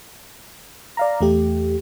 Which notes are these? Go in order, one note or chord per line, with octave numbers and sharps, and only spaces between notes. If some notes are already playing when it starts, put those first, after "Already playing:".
D5 F5 A#5
E2 A3 G4